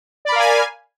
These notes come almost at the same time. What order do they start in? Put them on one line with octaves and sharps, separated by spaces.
D5 B5 A#4 F5 G#5